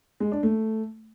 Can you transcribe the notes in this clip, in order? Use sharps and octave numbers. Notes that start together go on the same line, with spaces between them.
G#3
D4
A3